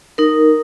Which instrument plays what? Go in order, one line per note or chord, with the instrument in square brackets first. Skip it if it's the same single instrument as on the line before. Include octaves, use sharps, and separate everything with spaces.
[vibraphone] D#4 A#4